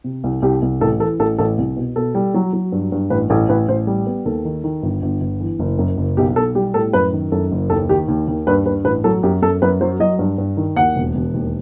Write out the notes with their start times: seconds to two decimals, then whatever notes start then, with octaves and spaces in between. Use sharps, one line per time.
0.04 C3
0.24 C2
0.42 C2 G4
0.62 C2
0.81 A1 A4
1.00 E3 A4
1.19 A1 A4
1.38 A1 A4
1.58 C2
1.77 B2
1.96 B2 A4
2.15 G3
2.34 F#3
2.53 F#3
2.72 G2
2.92 G2
3.10 A1 B4
3.30 A1 A4
3.49 A1 B4
3.68 A1 C5
3.87 G3
4.06 B3
4.25 D#2 A4
4.45 D#3
4.64 D#3
4.83 G1
5.02 G1
5.21 G1
5.41 E3
5.59 F#1
5.79 F#2
5.97 F#1
6.17 B1 G4
6.36 B1 A4
6.55 G3 G4
6.74 A2 A4
6.93 F#2 B4
7.13 D#3
7.32 F#2 A4
7.51 F#1
7.70 D#2 A4
7.89 D#3 G4
8.08 D#2
8.28 D#2
8.47 G2 B4
8.65 G2 B4
8.84 A1 B4
9.04 F#3 A4
9.23 F#2 G4
9.42 F#2 A4
9.62 F#2 B4
9.81 F#3 C5
10.00 F#3 D#5
10.19 G2
10.38 G2
10.57 D#3
10.76 D#2 F#5
10.96 E1
11.15 E1
11.34 D#2